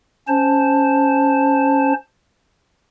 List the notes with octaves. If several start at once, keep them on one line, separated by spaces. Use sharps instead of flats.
C#4 C5 A5